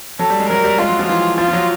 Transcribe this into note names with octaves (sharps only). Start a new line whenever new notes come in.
F#3 A4
G3
G#3
F#3 A#4
G3
G#3 F4
F#3
F3
E3 F4
F3 F4
F3
F#3